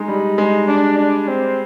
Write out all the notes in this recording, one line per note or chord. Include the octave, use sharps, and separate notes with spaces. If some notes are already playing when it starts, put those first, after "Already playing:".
Already playing: G#3 D#4
G3
G#3
D4
D4
C4